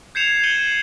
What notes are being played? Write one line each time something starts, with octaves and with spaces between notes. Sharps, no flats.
G6 G#6 C7 C#7 E7 F7
G6 C#7 D#7 F#7 G7